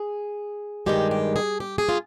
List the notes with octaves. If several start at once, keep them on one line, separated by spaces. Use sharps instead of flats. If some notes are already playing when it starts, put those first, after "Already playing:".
Already playing: G#4
G2 D#3 G#3 G4
G4
G#4
G4
G#4
F4